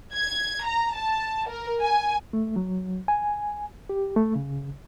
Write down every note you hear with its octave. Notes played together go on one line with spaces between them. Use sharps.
G#6
A#5
A5
A#4
G#5
A3
F#3
G#5
G4
A3
C#3